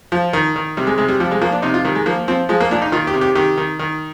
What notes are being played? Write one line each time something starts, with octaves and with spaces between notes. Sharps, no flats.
F3
D#3
D#3
C3 G3
G#3
C3 G#3
G3
F3 G3
G#3
F3 A#3
D4
C3 D#4
F4
D#3 G3
G#3
F3 A#3
F3 C4
F3 G#3
A#3
A#2 D4
D#4
D#3 F4
G4
C3
G4
D#3 G4
D#3
D#3